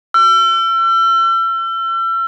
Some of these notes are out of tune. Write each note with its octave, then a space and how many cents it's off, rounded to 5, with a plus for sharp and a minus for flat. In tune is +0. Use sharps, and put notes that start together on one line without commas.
E6 +40